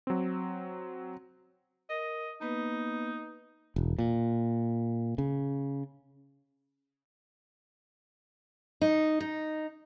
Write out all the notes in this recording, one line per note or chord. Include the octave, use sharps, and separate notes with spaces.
F#3 C4
A#4 D#5
A#3 B3 D#4 B4
E1
A#2
C#3
D#4
D#4